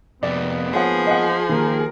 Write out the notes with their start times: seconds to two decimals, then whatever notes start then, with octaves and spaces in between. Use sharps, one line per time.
0.23 F2 G#2 C3 A#3 B3 D5
0.73 F3 G#4 C#5 F#5
1.07 D#5 F#5
1.49 D#3 A#3 G4 A#4